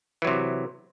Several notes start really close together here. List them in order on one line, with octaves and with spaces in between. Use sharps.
E3 F#3 C3